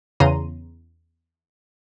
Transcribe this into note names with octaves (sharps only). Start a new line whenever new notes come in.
E2 C#3 A#5 C6 D#7